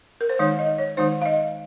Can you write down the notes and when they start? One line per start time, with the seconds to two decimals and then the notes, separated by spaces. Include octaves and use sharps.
0.21 A#4
0.29 C5
0.39 D#3 G#3 D#4 C#5
0.59 D#5
0.78 C#5
0.97 D#3 G#3 D#4 C5
1.22 F5
1.26 D#5